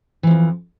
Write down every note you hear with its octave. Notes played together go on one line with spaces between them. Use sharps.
F2 E3 F3